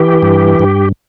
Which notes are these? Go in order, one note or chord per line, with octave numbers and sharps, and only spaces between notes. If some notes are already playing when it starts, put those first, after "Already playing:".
Already playing: E3 G4
G2
G2